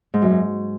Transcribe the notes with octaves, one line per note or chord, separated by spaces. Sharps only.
G#2
F#2
G#2